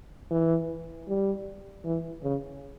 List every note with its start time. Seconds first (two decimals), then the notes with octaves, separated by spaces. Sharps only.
0.31 E3
1.08 G3
1.84 E3
2.23 C#3